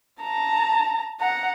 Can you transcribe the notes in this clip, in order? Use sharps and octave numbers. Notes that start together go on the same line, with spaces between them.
A5 A#5
F#5 A#5